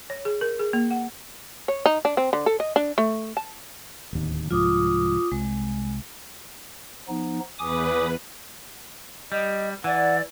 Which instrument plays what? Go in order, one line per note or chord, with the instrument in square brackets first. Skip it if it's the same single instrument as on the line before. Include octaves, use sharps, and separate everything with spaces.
[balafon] C#5
G#4
A#4
G#4
A#3
F#5
[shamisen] C#5
D#4
D4
C4
D3
A4
D#5
D4
A3
A5
[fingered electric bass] D1 D#2
[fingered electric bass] C2 G#2 F3 [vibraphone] F4 D6 D#6
[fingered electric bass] C2 [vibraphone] G#3
[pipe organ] F3 B3 D#4
[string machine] E2 B4 [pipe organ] G#5 D6 D#6
[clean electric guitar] G3 [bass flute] D#5
[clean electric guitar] E3 [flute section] D5 [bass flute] F#5